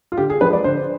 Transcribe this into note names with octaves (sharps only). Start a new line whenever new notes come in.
F4
D3 G4
G#4
F3 G#3 B4
D5
D3 C5